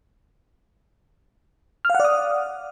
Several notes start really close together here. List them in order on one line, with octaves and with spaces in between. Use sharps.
F6 F5 F#5 D5 D#6